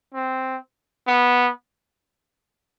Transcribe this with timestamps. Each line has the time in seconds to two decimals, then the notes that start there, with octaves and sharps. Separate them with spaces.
0.14 C4
1.07 B3